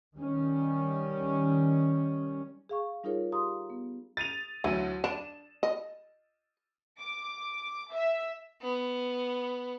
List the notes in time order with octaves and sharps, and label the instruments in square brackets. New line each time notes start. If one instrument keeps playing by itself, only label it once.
[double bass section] D#3 G3 C#4
[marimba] G#4 F5 C#6
G3 D#4 F4 G#4 A#4 C#5
G4 F5 A#5 C6 D#6
B3
[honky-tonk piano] A6 D#7 F7
[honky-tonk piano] D2 F#3 D#7 [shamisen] E3
[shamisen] D4 [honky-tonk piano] E7
[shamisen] D#5
[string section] D6
E5
[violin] B3